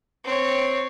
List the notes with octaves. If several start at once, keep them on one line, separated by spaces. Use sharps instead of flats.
C4 C#5